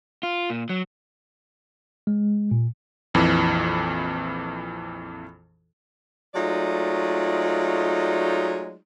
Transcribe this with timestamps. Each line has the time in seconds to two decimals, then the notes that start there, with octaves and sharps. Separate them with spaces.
0.23 F4
0.50 A#2
0.69 F#3
2.07 G#3
2.51 A#2
3.14 A#1 F2 E3
6.35 F#3 G#3 A3 D#4 F4 D5